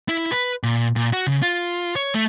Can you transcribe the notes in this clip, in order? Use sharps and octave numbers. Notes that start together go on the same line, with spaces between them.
E4
B4
A#2
A#2
F#4
C#3
F4
C#5
A3